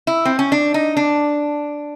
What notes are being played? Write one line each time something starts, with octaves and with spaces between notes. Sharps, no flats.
E4
C4
C#4
D4
D#4
D4